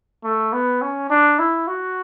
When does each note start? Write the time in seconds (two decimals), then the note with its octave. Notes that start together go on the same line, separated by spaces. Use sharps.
0.24 A3
0.53 B3
0.82 C#4
1.10 D4
1.39 E4
1.67 F#4